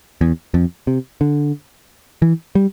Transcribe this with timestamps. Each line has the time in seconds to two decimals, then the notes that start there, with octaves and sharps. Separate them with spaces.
0.21 E2
0.54 F2
0.87 C3
1.21 D3
2.22 E3
2.55 G3